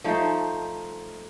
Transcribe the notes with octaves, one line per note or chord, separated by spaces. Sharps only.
F3 A3 D#4 C5